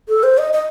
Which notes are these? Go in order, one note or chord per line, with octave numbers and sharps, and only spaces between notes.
A4
C5
D#5
D#5